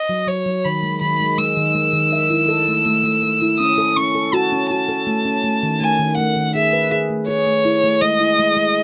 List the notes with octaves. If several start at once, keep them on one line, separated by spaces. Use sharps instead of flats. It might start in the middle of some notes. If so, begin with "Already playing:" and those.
Already playing: D#5
F#3
F#3 C#5
F#3
D#3 B5
G#3
D#3 B5
G#3
G#3 E6
D#3
G#3
D#3
E5
E4
A4
A3
A3
A3
A3
E4
C#4 D#6
A4
C#4 C#6
A4
F#4 A5
C#4
F#4 A5
A4
A3
C#4
A3
D#3
A3 G#5
D#3
A3 F#5
D#3
G#4 E5
B4
G#4
A3
G#4 C#5
A3
E4
A3
G#3 D#5
E4
G#3
G#3